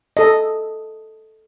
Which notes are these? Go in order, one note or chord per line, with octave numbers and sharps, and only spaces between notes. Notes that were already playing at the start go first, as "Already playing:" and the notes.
A4 D#5